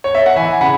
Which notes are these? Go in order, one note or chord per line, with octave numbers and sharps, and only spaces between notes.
C#5
E5
F#5
E3 E5 G#5
C#3 F#5 B5